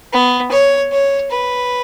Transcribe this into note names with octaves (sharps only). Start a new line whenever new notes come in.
B3
C#5
C#5
B4